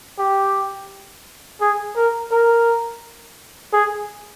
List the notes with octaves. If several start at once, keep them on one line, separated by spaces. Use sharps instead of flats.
G4
G#4
A#4
A#4
G#4